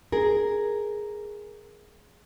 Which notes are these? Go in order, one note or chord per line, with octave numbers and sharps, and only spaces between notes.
G#4 A#4